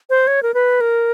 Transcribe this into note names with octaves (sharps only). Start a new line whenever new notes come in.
C5
C#5
A#4
B4
A#4